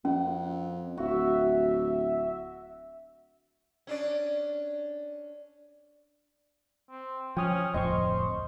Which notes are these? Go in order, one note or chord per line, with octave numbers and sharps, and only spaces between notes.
F2 C#4 F#5
D1 F#4 E5
C#4 D4 D5
C4
F3 C#4 G5 D#6 F6
D1 F2 C5 D#5 C#6